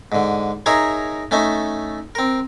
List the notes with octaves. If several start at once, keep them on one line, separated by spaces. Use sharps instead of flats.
G#2 D3
D#4 G#4 A#4 C#5 E5 A#5
A3 C#4 D#4 A4 E5
C4 A#4